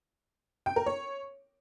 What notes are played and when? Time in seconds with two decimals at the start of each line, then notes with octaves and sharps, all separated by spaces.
0.66 G5
0.76 A#4
0.86 C#5